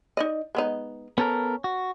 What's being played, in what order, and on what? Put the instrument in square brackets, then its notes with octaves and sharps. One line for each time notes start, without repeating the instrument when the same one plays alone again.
[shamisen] D#4 D5 D#5
G#3 B3 D#4
[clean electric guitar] B3 A4 A#4 [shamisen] C#4
[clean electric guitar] F#4